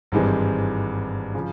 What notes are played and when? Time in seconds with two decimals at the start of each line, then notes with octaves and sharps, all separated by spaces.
0.12 G#1 G2 E3 G#3 C4
1.35 C#3 F3